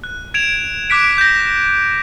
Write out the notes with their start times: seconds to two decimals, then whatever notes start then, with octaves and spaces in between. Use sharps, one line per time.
0.04 F#6
0.34 G#6 D7 E7 F7
0.90 D6 F#6 B6 D7
1.18 G6 A#6